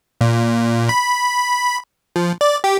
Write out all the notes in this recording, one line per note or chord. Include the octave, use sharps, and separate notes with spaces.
A#2
B5
F3
D5
G4